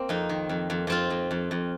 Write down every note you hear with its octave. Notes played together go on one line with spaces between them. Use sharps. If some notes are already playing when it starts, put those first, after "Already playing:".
Already playing: A#3 C4
F2 D#4
D#3
F2
F2
F2 C4 F4
F2
F2
F2